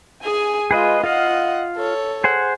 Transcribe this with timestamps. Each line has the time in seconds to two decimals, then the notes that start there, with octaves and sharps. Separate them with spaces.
0.22 G#4 G#5
0.71 G#3 F4 G#4 B4 D#5
1.04 F4 D#5 F5 F#5
1.76 A4 C#5
2.24 G#4 C5 F#5